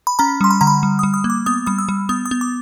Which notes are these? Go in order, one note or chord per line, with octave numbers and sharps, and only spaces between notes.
B5
C#4 A#5
G3 C6
B5
D3 A#5
B5
G3
D#6
G3
D#6
A#3
D6
B3 D#6
G3 D#6
E6
G3
B3 D#6
D#6
B3
D6